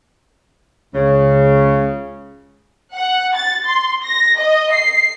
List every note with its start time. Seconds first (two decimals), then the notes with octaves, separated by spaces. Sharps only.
0.94 C#2 C#3
2.94 F#5
3.35 A6
3.66 C6
4.03 A#6
4.38 D#5
4.72 C7